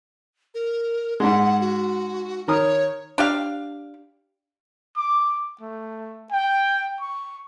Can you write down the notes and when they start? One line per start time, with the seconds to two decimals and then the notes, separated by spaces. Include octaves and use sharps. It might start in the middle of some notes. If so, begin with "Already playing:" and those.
0.54 A#4
1.20 G#2 G#3 F#5
1.61 F#4
2.48 D#3 A#4 C#5 D#6
3.18 D4 G4 F5
4.97 D6
5.61 A3
6.32 G5
7.01 C#6